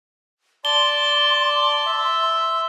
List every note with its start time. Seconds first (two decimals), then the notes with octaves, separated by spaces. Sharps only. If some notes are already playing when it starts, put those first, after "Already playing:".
0.65 D5 A5 C6 G7
1.86 E5